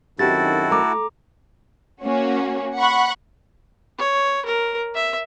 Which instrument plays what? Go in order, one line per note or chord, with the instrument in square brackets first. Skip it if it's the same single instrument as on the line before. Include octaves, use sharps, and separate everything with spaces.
[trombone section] F#2 D#3 [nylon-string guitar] C4 G4 [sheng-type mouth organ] E4 F#4 A4 [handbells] A6
[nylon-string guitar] A3 [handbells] A#5 D6
[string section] A#3 C#4 F#4
F#5 B5 C#6 F#6
[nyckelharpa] C#5
A#4
E5